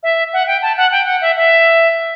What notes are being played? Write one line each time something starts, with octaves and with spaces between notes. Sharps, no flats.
E5
F#5
G5
A5
F#5
G5
F#5
E5
E5